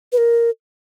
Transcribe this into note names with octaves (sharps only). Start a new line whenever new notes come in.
B4
A#4